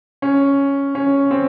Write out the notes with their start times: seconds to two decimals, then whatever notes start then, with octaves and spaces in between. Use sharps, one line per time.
0.22 C#4
0.95 C#4
1.31 C4